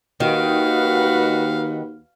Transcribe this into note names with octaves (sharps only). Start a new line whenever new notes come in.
D#2 D#3 F#4 B4 F5